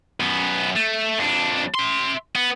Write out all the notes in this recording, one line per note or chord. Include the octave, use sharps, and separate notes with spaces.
F#2 B3
A3
F2 D4
E5 C6
B3